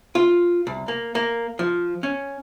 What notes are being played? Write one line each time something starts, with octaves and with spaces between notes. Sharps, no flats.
F4
C2
A#3
A#3
F3
C#4